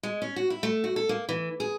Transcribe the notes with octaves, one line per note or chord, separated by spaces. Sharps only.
G#3
C#4
F#4
E4
A3
F#4
A4
A#3
E3
G#4